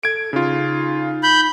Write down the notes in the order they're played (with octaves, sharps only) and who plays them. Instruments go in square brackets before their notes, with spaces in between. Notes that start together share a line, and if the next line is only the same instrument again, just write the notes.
[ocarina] A4 [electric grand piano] G#6 D7
[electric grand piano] C#3 F4 [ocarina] D#4
[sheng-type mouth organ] B5 G6